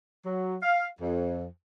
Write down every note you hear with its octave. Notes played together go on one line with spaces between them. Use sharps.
F#3
F5
F2